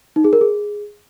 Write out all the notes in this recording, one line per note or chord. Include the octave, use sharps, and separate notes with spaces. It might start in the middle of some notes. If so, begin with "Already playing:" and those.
D#4
G#4
A#4
G#4